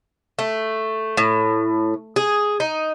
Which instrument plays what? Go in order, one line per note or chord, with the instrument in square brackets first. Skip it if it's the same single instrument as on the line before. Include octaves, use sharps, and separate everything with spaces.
[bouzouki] A3
A2
G#4
D#4